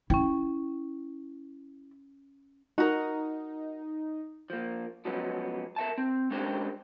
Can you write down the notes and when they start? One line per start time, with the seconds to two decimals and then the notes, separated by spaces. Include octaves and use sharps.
0.10 C#4 E4 G5
2.78 D#4 F#4 A#4
4.50 F3 A#3
5.05 F3 F#3 G#3 B3 C#4
5.76 A#4 E5 A5
5.98 C4
6.31 G#3 C#4 D4 G4 A#4 C5